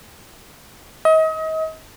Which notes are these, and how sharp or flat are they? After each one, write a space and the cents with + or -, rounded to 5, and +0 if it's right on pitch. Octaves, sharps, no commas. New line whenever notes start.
D#5 +35